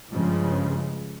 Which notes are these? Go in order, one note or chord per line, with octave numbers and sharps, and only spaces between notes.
G2 C#3 F3 G#3